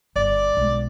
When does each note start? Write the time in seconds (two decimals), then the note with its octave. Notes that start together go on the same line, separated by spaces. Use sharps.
0.16 G1 D5
0.57 B1 G#3